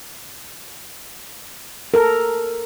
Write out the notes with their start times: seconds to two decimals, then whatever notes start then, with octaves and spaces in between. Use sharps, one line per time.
1.94 A4 A#4